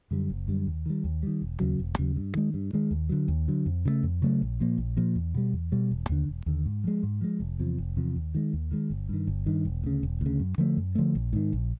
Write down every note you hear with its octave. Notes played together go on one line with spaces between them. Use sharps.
F#2 D3 G3
F#1
F#2 D3 G3
D#2
D#3 G3
D#2
D#3 G3
E1
D#2 C#3 F#3
E1
D#2 C#3 F#3
G2
D#3 G#3
G2
D#3 G#3
D#2
D3 F#3
D#2
D3 F#3
F2
C#3 F#3 A3
F2
C#3 F#3 A3
A#1
A#2 F3 A#3
A#1
A#2 F3 A#3
E2
B2 G3
E2
B2 G3
E1
D#2 D3
E1
D#2 D3
G#2
F3 G#3
G#2
F3 G#3
F1
E2 C3 F3
F1
E2 C3 F3
D#2
D#3 G#3
D#2
D#3 G#3
G1
G2 D#3
G1
G2 D#3
E1
D2 C#3
E1
D2 C#3
F#2
D3 F3 A3
F#2
D3 F3 A3
A#1
G#2 D#3
A#1